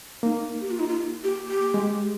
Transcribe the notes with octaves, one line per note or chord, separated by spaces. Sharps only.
A#3 D#4
G4
F4
D#4
F4
G4
G4
G#3